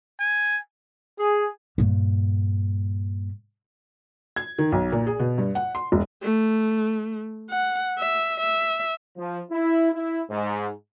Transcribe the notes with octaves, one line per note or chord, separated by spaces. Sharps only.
G#5
G#4
G2 A#2
G#6
D#3
B1
A#2
G#4
B2
G2
F#5
C6
E1
A3
F#5
E5
E5
F3
E4
E4
G#2